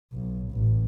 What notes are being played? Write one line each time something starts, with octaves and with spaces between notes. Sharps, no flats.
B1
A1